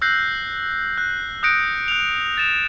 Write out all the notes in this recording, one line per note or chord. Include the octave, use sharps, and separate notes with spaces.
E6 F#6 G6 A#6 C7
F#6
D#6 F#6 G6 A#6 C#7 D7
F#6 F7
A6 E7